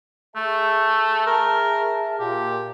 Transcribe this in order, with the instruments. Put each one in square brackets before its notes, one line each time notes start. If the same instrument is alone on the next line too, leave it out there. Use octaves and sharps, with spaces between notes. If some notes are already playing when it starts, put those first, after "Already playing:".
[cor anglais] A3 [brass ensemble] G#4 E5 A5
[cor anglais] A#4
[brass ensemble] A#2 [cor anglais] G4